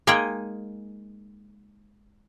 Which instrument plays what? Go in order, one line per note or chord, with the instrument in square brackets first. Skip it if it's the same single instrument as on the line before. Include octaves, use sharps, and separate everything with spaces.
[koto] G#3 A#3 D#4 G#4 D#5 G5